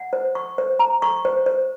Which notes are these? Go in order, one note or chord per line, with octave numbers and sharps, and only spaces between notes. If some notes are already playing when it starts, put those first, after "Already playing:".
Already playing: F#5
C5
C#6
C5
A#5
C#6
C5
C5